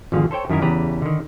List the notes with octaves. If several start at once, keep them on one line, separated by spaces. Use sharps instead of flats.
G#1 B2 D3 F3 G#4 F5
A4 C5 C#5 G5
F#2 D#3 E4 A#4 G#5
E2 C#3 G4 B4 A5 A#5
D3 D#3